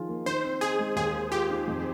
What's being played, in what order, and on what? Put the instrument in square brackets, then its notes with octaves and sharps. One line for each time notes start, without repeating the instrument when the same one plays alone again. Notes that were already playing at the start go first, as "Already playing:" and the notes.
Already playing: [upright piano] D#3 F3 F4 G#4
A#3
[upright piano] D#3 [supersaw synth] C5
[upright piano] C4
[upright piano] D#4 [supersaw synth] G#4
[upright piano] G#3
[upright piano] D#2 [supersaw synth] G#4
[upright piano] A#3
[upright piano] F4 [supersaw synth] G4
[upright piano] D#3
F2